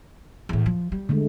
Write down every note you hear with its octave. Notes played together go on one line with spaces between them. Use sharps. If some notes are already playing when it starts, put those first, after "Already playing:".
E2 A2
F3
G3
D3 G#3 A3